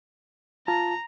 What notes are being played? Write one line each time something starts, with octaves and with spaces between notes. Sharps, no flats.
F4 A5 A#5